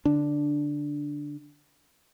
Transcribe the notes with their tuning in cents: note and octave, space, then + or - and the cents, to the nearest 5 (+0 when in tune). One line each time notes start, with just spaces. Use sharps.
D3 -10 D4 +0